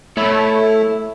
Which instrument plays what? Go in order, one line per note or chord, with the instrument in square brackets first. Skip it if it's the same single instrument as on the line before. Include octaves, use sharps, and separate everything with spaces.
[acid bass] A3 [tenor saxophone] E4 [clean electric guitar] A4 C#5 B5